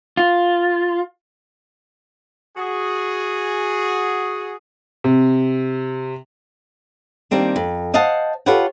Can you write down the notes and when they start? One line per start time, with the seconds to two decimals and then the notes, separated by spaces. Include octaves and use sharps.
0.17 F4
2.57 F#4 G#4
5.04 C3
7.31 D#3 G3 A#3 C4 D4
7.56 F2
7.94 C5 D#5 F5 F#5 A5
8.46 F4 G4 A4 B4 C#5 F#5